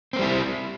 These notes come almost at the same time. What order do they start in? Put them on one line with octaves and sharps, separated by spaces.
C4 A#3 G3 E4